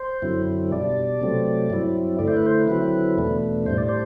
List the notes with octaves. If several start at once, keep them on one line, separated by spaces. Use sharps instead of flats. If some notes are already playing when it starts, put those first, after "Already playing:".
Already playing: C5
F#2 D3 F#3 C4 E4
B2 G3 D4 D5
C3 F#3 A3 C4
G2 F#3 C4 E4
D3 A3 E4 D5
C5
B4
C5
D3 F#3 C4 E4 B4
E2 B2 A3 D4
A2 G3 D4 C5
D5
C5